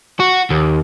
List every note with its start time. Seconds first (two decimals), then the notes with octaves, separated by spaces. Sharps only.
0.20 F#4
0.51 D#2